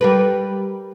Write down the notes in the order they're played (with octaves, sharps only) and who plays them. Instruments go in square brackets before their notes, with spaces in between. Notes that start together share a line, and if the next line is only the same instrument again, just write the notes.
[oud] G3 A#4 B4